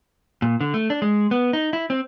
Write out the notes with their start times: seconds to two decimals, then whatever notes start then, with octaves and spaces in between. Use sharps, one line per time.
0.42 A#2
0.61 D3
0.74 A3
0.90 D4
1.02 G#3
1.31 B3
1.53 D#4
1.73 E4
1.90 C4